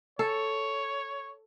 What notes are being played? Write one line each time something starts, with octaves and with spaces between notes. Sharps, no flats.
A4 C#5